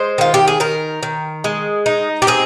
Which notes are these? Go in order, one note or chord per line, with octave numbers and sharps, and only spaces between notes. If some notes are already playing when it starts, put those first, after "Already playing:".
Already playing: G#3 C5
D#3 F4
G4
G#4
D#3 A#4
D#3
G#3
D#4
G4
C4 G#4